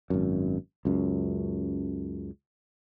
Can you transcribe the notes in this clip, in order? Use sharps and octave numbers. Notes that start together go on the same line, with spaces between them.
G#1 F#2
C#2 F#2